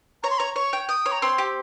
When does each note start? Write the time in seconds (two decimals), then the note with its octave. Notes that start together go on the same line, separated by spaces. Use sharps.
0.23 C#5 A#5
0.30 C6
0.38 C#5 A#5
0.56 C#5 C#6
0.73 G5
0.89 G5 D#6
1.06 C#5
1.11 A#5
1.22 C4 C6
1.38 G4